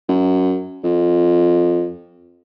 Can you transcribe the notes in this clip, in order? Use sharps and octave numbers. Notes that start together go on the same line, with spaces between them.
F#2
F2